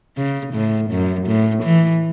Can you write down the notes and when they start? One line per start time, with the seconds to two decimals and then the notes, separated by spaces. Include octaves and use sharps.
0.17 C#3
0.54 A2
0.91 F#2
1.27 A2
1.64 E3